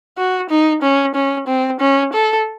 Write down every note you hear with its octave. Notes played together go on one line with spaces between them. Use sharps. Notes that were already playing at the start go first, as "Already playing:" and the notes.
F#4
D#4
C#4
C#4
C4
C#4
A4